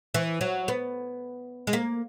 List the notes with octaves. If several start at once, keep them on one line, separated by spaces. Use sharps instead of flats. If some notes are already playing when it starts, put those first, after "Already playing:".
E3
F#3
B3
G#3
A#3